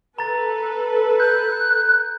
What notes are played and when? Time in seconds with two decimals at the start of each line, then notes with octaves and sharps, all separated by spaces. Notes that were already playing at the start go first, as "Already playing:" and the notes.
0.18 A4 B4 A#5 A6
1.20 F#6 G6